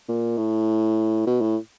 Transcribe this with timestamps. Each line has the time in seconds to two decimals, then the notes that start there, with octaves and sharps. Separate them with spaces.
0.09 A#2
0.37 A2
1.27 B2
1.41 A2